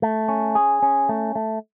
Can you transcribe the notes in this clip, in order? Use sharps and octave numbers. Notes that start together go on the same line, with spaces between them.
A3
C#4
G#4
C#4
A3
A3